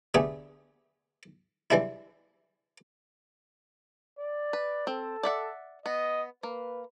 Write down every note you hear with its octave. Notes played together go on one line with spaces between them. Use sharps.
D3 A3 B3 G4 G#4
E3 G3 G#3 D4 E4
D5
B4
C4 A4
D5 E5 F#5
B3 D#5
A#3 B4